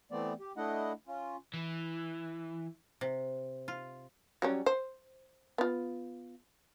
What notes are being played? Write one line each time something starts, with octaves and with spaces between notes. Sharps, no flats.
E3 A3 B3 C4 D5
G4
A3 D4 E4 D#5 F#5
C#4 F4
E3
C3
F4
F#3 G3 C#4
C5
B3 F4